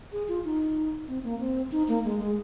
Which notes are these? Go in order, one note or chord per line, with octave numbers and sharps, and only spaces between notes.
G#4
F4
D#4
C4
A#3
C4
D#4
A#3
G#3
G#3